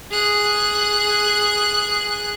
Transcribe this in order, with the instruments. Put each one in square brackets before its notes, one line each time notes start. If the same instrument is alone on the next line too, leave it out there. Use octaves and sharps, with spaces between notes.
[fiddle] G#4 F#6